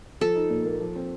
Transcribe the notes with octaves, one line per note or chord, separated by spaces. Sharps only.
F3 A4
D#4
A#2
A#3
F3
C4